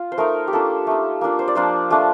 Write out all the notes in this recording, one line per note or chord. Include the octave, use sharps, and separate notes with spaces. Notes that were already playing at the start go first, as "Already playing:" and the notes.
Already playing: F4
C5
A3 D#4 A#4
G4
A#3 D4 F4 A4
A3 D#4
A#3 D4 F4
C5
D5
F3 A#3 D4 F4 C5
F3 A3 D4